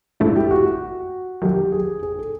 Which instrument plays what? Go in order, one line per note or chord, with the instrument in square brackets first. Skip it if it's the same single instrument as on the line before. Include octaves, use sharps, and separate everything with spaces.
[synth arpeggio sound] G#2 F3 A3 D4 [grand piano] E4
[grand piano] G4
F#4
F#4
[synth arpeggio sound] F#2 D#3 F#3 [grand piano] G4
[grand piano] G#4
G#4
A4